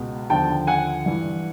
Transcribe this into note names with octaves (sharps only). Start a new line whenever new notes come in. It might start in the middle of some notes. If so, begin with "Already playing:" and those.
Already playing: C#2 B2
D#2 D3 F3 G5 A5
F#5 G#5
G2 E3